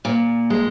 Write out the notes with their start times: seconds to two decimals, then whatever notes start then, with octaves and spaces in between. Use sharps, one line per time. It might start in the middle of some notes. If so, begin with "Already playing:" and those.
0.05 A#2
0.50 G#3